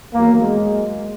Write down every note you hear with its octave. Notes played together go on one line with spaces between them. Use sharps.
E2 D#3 F#3 A#3
G#3